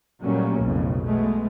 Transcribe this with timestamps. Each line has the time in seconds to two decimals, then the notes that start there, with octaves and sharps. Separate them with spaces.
0.22 A#2 F#3 G3 A3 A#3 C#4
0.62 B1 F2 A2 C#3
1.04 B2 G#3 A3